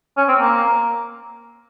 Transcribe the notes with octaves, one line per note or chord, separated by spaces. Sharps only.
C#4
C4
A#3